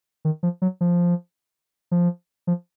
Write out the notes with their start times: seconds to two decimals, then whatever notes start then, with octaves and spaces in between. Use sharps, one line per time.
0.25 D#3
0.43 F3
0.62 F#3
0.81 F3
1.91 F3
2.47 F3